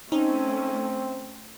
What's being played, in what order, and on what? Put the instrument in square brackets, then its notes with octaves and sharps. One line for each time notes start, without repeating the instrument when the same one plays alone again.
[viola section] A3 C#4 [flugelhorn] C4 [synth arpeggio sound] D#4